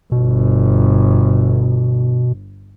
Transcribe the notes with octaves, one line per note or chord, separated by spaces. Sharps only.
G1 B2